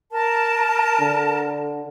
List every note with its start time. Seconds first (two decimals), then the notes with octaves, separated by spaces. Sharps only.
0.12 A#4 A5
1.00 D3